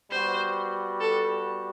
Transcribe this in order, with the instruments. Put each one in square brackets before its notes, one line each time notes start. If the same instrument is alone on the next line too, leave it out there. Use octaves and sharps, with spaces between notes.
[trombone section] G3 B3 F#4 [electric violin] C5
[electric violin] A4